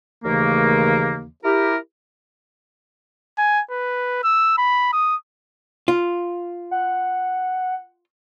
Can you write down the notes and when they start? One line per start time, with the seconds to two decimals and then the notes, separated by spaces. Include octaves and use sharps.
0.24 D#2 C#3 E3 A3 A#3
1.44 E4 G4 A#4
3.38 G#5
3.71 B4
4.24 E6
4.58 B5
4.93 D#6
5.88 F4
6.71 F#5